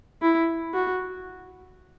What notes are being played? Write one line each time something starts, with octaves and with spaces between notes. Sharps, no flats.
E4
F#4